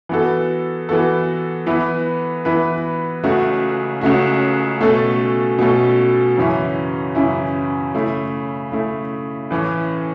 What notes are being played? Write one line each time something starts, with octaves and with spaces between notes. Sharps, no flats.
E3 B3 F#4 A4
E3 B3 F#4 A4
E3 B3 E4 B4
E3 B3 E4 B4
C#2 C#3 A3 F#4
C#2 C#3 A3 F#4
B2 A3 C#4 A4
B2 A3 C#4 A4
F#2 C#3 E3 C#4 E4
F#2 C#3 E3 C#4 E4
C#3 A3 E4
C#3 A3 E4
A2 E3 C#4